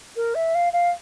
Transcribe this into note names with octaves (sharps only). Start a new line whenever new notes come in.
A#4
E5
F5
F5